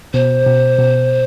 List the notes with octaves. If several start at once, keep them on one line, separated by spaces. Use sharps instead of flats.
B2 C5
B2
B2